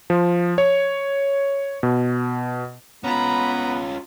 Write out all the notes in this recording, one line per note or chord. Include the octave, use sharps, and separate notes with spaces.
F3
C#5
B2
B3 C#4 F4 A#5 B5